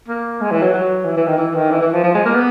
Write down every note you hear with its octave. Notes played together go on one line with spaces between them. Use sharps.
A#3
G#3
E3
F#3
F#3
E3
E3
D#3
E3
D#3
E3
E3
F3
F3
G#3
A#3
B3